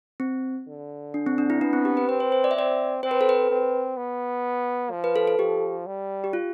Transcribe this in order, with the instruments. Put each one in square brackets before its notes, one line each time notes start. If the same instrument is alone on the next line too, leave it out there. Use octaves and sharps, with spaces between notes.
[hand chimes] C4
[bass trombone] D3
[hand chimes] D4
C4
D4
E4
[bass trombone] B3 [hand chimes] D4
[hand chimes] C4
G4
B4
[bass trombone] C4 [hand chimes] B4
[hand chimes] C5
C5
D5
E5
[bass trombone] C4 [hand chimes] D5
[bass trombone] C4 [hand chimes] C5
[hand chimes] B4
A4
B4
[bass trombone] C4
B3
F3
[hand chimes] B4
A4
A4
[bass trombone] F3 [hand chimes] G4
[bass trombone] G3
[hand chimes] G4
F4